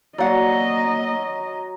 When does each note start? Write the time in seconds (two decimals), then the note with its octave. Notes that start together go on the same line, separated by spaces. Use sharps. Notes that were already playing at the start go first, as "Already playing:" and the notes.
0.18 F#3 A#3 D5 D#5 F#5